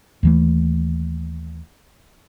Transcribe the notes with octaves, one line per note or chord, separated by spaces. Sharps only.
D#2 E3 A3